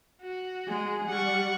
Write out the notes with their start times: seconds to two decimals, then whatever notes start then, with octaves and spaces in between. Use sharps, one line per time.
0.22 F#4
0.68 G#3 G#4
1.08 G3 F#5 C#6